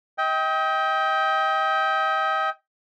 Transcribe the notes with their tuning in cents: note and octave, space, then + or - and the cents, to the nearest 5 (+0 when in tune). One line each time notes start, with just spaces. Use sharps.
D#5 +35 G5 +0